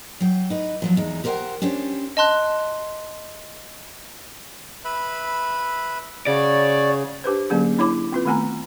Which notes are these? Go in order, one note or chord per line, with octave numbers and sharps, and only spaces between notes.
F#3 G5
D#4 B4
D#2 F3 F#3
E2 G#3 D#4
G4 A#4 C5 C#5 F#5 G5
C#4 D4 G4 C5 C#5
D#5 A5 C6 F#6
B4 E5 B5
C#3 F#4 C#5 D5
D4 G4 B4 C5
D3 F#3 A#3 C#4 G#4
D4 E4 C#5 B5 D6
C4 F4 B4
D#3 A3 B3 G#5 A#5